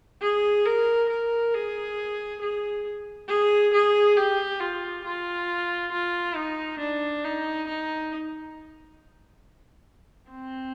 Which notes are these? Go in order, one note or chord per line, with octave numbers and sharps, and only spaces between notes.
G#4
A#4
A#4
G#4
G#4
G#4
G#4
G4
F4
F4
F4
D#4
D4
D#4
D#4
C4